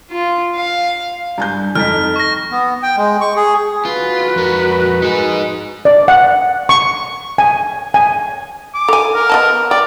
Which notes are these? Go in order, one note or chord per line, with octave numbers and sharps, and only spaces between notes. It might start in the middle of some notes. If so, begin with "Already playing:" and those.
F4
F5
G2 G#5 G6
F2 D#4 F6 B6
C#6 A#6
B3
G5
G#3
C#6
G#4
F4 F#4 B4
F2 A#4
D#4 G#4
D5
F#5
C#6
G#5
G#5
D6
A4 G#5
A#4
B3 D#5 A5
D5 G5